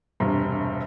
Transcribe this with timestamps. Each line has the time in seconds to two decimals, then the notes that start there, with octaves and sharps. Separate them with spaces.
0.20 E1 G2 C3